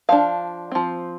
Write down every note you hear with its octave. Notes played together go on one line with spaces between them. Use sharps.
F3 D4 F5
F3 C4